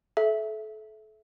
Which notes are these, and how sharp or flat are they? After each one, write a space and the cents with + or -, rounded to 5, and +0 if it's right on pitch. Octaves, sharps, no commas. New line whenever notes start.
A4 -30 E5 +0